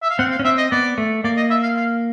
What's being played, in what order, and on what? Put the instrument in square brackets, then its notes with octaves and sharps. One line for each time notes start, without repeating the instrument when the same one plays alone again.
[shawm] E5
F5
[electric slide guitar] C4 [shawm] F#5
[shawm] F5
[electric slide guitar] C#4
[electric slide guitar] C4 [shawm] E5
[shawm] D#5
[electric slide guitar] B3 [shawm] D5
[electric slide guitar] A3
[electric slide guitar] A#3 [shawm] D5
[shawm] D#5
E5
F5
F5